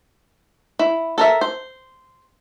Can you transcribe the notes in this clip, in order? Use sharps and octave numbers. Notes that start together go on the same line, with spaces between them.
E4
A4 A#4 E5
C5